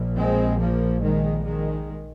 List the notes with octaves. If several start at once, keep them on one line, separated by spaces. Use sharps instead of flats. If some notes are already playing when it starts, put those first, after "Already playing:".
Already playing: A#1 A#2
G#3 C4
F3 A#3
D#3 G#3
D#3 G#3